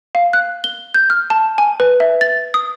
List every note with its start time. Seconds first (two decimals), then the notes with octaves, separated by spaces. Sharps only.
0.15 F5
0.33 F#6
0.64 G7
0.94 G6
1.10 F6
1.30 A5
1.58 G#5
1.80 B4
2.00 E5
2.21 A6
2.54 D#6